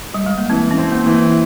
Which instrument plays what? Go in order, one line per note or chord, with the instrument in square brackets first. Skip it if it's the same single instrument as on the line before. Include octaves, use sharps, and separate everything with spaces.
[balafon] G3
G#3
A#3
[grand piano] E3 [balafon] C4
[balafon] C#4
[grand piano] C4
[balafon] A#3
[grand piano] E3
[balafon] A#3